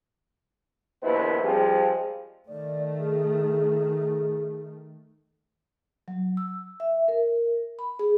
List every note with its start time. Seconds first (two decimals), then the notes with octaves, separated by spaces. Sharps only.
1.03 A#1 D#2 B3 E4 B4 C5
1.44 F3 G3 G#3 C4
2.49 D#3 A3 D5
2.98 G#4
6.08 F#3
6.37 E6
6.80 E5
7.08 A#4
7.79 B5
7.99 G#4